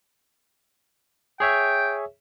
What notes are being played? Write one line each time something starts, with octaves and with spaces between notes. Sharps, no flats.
G#4 C#5 E5 G5